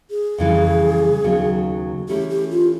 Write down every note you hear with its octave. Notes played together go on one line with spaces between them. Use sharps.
G#4
F2 C#3 E3 G3
D#2 C#3 F#3 B3 D#4
E3 A3 C#4 E4 G4
G4
F4